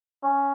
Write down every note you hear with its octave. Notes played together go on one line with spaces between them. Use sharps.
C#4